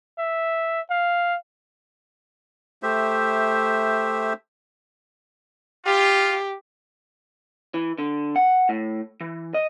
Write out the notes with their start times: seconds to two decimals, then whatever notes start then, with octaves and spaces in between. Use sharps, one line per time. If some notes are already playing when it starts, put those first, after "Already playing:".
0.19 E5
0.90 F5
2.83 A3 G4 C5 E5
5.86 F4 G4
7.74 E3
7.98 D3
8.36 F#5
8.69 A2
9.21 E3
9.54 D#5